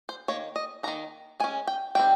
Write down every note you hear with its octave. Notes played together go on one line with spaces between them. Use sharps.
C5
D#3 A#3 C#5
D#5
D#3 A#3 D#4 A#5
G#3 C#4 G#5
G5
D#3 G3 C4 G5